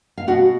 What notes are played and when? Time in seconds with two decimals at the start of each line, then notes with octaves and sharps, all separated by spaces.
0.17 F5
0.27 B2 F#4 F#5